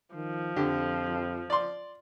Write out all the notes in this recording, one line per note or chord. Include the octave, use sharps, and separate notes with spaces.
D#3 F3
F2 D3 G4
D5 C6